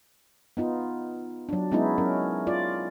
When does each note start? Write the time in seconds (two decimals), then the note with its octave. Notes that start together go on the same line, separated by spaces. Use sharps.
0.57 B3 D#4 F4
1.49 F#3 D4
1.72 G#3 B3 C#4 D#4 E4
1.98 F#3 C#4 A#4
2.47 F4 D5